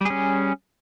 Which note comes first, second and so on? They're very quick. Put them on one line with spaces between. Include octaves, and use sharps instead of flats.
G3 G#4 C#4